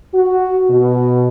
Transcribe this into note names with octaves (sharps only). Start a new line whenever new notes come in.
F#4
B2